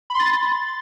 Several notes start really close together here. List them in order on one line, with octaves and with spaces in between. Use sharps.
B5 C6 A6